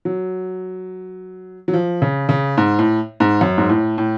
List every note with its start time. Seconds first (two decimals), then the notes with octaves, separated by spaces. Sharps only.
0.05 F#3
1.68 F#3
1.73 F3
2.02 C#3
2.29 C#3
2.57 G#2
2.79 A2
3.20 G#2
3.41 F#2
3.58 G#2
3.69 A2
3.98 A2